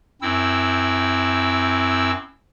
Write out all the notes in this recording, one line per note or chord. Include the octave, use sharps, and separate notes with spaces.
F#2 C4 E4 E6